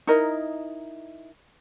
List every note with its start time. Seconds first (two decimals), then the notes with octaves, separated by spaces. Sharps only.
0.07 D#4 E4 A#4 D#5